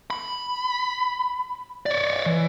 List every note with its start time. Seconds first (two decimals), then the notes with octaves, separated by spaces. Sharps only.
0.10 B5
1.86 C#5 D5
2.26 E3